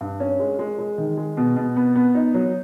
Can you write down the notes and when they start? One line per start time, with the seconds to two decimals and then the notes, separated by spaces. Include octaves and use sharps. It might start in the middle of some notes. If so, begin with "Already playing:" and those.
0.01 G2
0.20 C#4
0.39 G#3
0.59 G#3
0.79 G#3
0.98 D#3
1.17 G#3
1.37 B2
1.56 B2
1.76 B3
1.96 B3
2.15 D#4
2.34 F#3